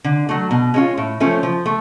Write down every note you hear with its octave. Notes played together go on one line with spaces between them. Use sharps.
D3
F#3 A3
B2
G#3 C#4 F4
A2
F3 A3 C#4
F3
A3